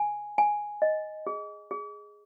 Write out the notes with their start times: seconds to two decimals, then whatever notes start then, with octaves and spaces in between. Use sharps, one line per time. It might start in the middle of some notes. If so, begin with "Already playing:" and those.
Already playing: G#5
0.38 G#5
0.82 D#5
1.27 G#4
1.71 G#4